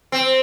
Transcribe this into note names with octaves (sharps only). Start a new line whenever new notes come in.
C4